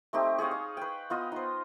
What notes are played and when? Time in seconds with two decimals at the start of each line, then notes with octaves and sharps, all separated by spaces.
0.13 A3 C4 D#4 G4
0.38 G#4 C#5 D#5 F5
0.51 D#5
0.77 B4 G5
1.10 B3 F4 D#5
1.32 D#4 C5